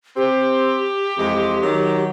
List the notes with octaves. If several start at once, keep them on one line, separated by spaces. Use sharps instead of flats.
C4 G4
F2 E3 G#3
D#3 F#3